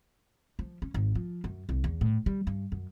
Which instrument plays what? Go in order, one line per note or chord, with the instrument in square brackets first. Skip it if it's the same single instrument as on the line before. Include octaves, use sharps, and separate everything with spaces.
[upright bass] F3
C#4
G#1
F3
F#2
C2
E2
A2
G3
G2
F#2